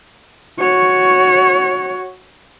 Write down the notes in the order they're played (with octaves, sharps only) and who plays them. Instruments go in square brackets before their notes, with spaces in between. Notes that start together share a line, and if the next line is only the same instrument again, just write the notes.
[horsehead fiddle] F#4 C#5